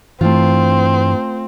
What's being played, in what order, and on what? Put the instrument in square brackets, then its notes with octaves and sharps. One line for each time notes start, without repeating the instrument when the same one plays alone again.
[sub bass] G2 [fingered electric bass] E3 [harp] A3 F4 [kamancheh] C4